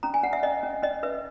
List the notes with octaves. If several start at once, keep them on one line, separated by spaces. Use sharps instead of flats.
C#4 A#5
G#5
C#4 F#5
E5
C#4 D#5
C#4
C#4 D#5
B4 E5